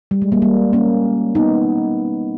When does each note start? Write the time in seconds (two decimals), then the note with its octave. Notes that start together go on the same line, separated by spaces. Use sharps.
0.11 G3
0.22 G#3
0.32 G3 A#3
0.42 G3 A#3
0.73 A#3 C#4
1.35 B3 D#4